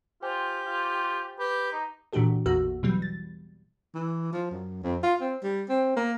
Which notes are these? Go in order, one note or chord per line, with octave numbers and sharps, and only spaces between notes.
F4 G4 C5 G5 G#5
F4
G4 B4
D#4
A#2 E3 D4 F#4 G4 A4
A1 E2 A#3 F#4 E6
B2 E3 F#3 G3
A6
E3
F3
F#2
F2
F4
C4
G3
C4
A#3